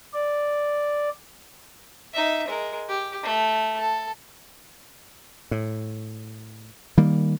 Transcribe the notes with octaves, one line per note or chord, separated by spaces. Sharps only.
D5
D#4 E5
G#3 A#4
G4
A3
A4
A2
D#3 G3 A#3